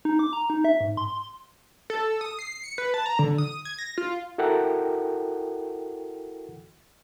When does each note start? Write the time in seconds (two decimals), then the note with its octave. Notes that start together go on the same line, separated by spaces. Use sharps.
0.05 D#4
0.19 D6
0.33 A#5
0.50 D#4
0.65 E5
0.81 G#2
0.97 C6
1.10 C6
1.90 A4
2.21 D#6
2.39 C7
2.63 C#7
2.78 B4
2.94 A5
3.06 A#5
3.19 D3
3.38 D#6
3.65 G#6
3.78 A#6
3.98 F4
4.38 E4 F#4 A4 A#4 F#5 G5